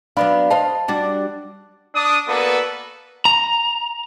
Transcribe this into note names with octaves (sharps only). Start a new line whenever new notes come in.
F#3 B3 D4 F5 B5
C5 D#5 F5 A5
G3 D4 F#4
D4 D#6
A#3 B3 F#4 A4 B4 D5
A#5